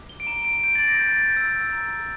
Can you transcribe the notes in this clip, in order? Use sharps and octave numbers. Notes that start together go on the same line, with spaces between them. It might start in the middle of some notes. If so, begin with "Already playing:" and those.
Already playing: D6
G7
D7
A#5 E7
D7
G6 D7
A6
A#6
G6
A6
E6
A#5